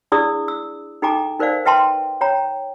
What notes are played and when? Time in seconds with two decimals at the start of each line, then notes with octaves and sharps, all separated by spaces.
0.12 D4 E4 G#4 D5 D#6 E6
0.48 E6
1.02 D#4 A4 G5 G#5 A#5 D6
1.39 D#4 A#4 C5 D5 F5
1.65 B4 E5 G5 A5 C6
2.21 C#5 G5 A#5